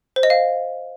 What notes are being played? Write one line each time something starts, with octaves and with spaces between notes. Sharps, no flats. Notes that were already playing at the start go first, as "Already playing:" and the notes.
C5
D#5
F5